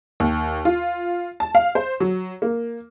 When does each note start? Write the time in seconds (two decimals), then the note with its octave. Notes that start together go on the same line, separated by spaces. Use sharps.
0.20 D#2
0.65 F4
1.40 A5
1.55 F5
1.75 C5
2.00 F#3
2.42 A#3